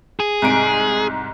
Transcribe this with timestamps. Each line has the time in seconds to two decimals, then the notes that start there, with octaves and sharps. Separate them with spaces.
0.20 G#4
0.42 C2 G#2 D7